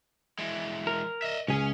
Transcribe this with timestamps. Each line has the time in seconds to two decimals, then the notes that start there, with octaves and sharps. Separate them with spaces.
0.39 E3 G#3
0.87 A#4
1.22 D#5 E5
1.48 C#2 C#4 G#4